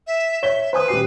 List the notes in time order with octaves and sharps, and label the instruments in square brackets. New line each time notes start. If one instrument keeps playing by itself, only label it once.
[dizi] E5
[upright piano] C#5 B6 G7 [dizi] E5
[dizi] B4 [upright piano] C5 G#5 D#6
[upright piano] D#1 G4 C7